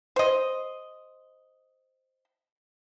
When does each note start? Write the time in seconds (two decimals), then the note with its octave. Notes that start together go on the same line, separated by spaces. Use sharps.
0.16 C5 D#5